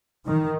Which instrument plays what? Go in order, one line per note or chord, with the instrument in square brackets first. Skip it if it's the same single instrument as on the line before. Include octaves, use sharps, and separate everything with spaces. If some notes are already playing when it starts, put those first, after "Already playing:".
[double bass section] D#3